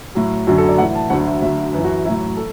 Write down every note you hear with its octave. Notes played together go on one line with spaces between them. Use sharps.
A2 F#3
F#2 D3 F#3 F#4
A4
D5
A2 E3 F#5
A5
D2 D3 F#3 F#5
E5
D2 D3 F#3 E5
F#2 B4
E3
F#4
A2 F#3 E4
A4